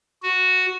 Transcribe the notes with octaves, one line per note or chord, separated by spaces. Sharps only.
F#4